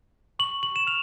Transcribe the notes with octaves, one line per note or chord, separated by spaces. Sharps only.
C#6 F#7
F#7
E7
F6 F7